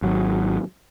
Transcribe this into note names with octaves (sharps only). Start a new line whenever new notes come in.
G#1 F#3